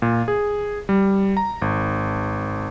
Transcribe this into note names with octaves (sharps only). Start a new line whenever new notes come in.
A#2
G#4
G3
A#5
G#1